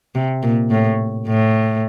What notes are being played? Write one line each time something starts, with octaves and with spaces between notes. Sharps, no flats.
C3
A#2
A2
A2